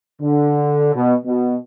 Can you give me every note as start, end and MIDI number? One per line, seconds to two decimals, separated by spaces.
0.21 0.92 50
0.94 1.13 47
1.25 1.55 47